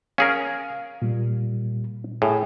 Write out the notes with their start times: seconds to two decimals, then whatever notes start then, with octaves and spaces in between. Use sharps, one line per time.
0.18 C#4 G#4 A#4 F5
1.02 A#2 G3
2.22 A2 G#4 G#5